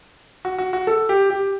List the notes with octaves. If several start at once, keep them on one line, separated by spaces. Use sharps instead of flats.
F#4
F#4
F#4
A4
G4
G4